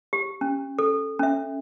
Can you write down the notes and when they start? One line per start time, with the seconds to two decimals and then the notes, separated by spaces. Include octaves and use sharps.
0.13 G4
0.41 C#4
0.79 A4
1.19 C#4 E5